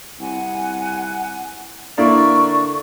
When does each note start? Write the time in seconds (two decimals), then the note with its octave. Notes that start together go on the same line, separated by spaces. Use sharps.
0.20 C2 F#5 G#5
1.98 D3 A#3 E4 D5 C#6